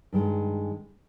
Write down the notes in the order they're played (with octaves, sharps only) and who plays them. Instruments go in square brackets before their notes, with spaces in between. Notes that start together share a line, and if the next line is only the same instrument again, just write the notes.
[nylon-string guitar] G2 D#3 G#3